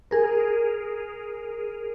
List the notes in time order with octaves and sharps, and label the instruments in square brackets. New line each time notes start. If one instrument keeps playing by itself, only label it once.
[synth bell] G#4 A#4